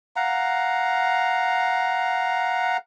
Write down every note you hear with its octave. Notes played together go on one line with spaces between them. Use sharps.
F5 F#5 A#5